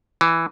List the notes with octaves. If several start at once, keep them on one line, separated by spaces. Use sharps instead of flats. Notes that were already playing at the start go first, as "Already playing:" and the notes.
E3